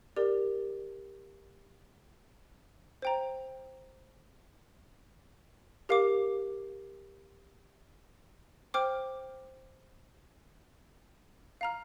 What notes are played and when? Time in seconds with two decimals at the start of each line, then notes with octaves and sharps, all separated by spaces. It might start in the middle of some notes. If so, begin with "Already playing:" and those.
0.16 G4 A#4 D5
3.02 C5 G5 A#5
5.89 G4 A#4 F5 D6
8.74 C5 G5 D6 F6
11.61 F5 A#5 F6